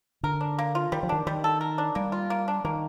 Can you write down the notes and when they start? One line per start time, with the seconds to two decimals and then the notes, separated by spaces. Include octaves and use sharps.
0.23 D3 A#4
0.41 D4
0.58 A#3
0.75 F4
0.92 D#3 G3
1.03 F3
1.09 D#3 D4
1.27 D#3 G3
1.44 A4
1.61 A#4
1.78 D4
1.95 G3 A#3
2.12 F4
2.30 A#3
2.48 D4
2.64 D#3 A#3